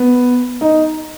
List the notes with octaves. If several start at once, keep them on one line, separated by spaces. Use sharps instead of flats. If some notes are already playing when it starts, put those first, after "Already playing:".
Already playing: B3
D#4